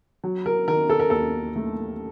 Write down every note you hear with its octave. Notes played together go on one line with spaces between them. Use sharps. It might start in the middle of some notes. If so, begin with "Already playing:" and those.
F#3
A#4
D#3 A#4
A4
A#4
D#2 A4
A3